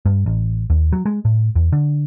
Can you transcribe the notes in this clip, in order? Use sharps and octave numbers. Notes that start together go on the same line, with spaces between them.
G2
A1
D#2
F#3
G#3
A2
E2
D3